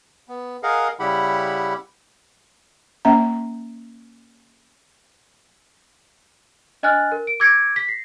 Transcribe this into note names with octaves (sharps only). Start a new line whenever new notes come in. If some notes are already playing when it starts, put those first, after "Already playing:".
B3
G#4 A#4 D#5 F5 F#5
C#3 G3 E4 G4 F#5 B5
A#3 C#4 E5 A#5
D4 D#5 G#5 F6 F#6 A6
A#4
D7
D6 E6 G#6 A#6 C#7 D7
B6
A#6 C7